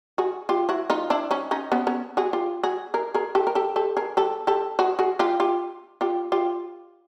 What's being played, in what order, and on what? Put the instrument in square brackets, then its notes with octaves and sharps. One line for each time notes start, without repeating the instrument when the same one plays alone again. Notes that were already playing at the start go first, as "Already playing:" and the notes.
[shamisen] F#4 G#4
F4 G4
E4 F#4
D#4 F4
D4 E4
C#4 D#4
C#4 D#4
B3 C#4
B3 C#4
F#4 G#4
F4 G4
F#4 G#4
G#4 A#4
G#4 A#4
G4 A4
A#4
G4 A4
G4 A4
G#4 A#4
G4 A4
G4 A4
F#4 G#4
F#4 G#4
F4 G4
F4 G4
F4 G4
F4 G4